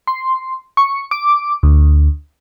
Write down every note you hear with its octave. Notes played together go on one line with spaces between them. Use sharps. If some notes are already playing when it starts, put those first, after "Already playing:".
C6
C#6
D6
D2